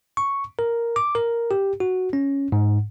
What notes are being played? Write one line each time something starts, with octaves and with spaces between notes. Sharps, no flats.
C#6
A#4
D6
A#4
G4
F#4
C#4
G#2